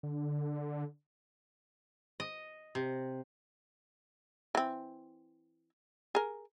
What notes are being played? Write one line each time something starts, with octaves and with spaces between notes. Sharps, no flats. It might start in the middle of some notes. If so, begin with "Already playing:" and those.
D3
D#5
C3
E3 C4
G#4 A#4